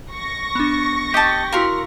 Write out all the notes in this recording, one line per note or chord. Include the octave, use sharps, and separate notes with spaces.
C#6 A#6
B3 D4
G4 D#5 A5 C#7
E4 F#4 A#4 F5 C6